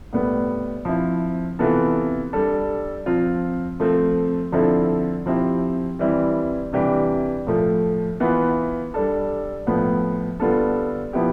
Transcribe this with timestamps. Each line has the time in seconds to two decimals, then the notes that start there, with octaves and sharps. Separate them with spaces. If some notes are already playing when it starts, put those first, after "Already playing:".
0.13 A2 G3 B3
0.85 F3 C4 E4
1.59 C3 E3 B3 F4 A4
2.33 G3 D4 A4
3.06 F3 C4 F4
3.80 F3 A3 C4
4.52 D3 F3 C4 E4 A4
5.26 F3 C4 E4 G4
5.99 E3 G3 C4 E4
6.73 C3 E3 G3 D4 G4
7.47 A2 F3 A3
8.20 E3 B3 F4
8.94 G3 D4 A4
9.67 A2 F3 B3
10.40 D3 G3 B3 F4 A4
11.13 F3 B3 E4 G4